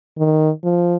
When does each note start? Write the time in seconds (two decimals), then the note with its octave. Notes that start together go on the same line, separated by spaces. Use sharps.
0.18 D#3
0.64 F3